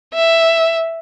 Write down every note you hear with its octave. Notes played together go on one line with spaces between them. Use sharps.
E5